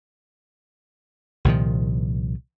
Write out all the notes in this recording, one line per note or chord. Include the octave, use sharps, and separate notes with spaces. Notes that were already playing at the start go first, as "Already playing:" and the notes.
C2 A#2 D#3 F3